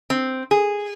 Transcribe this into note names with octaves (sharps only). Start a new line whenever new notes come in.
C4
G#4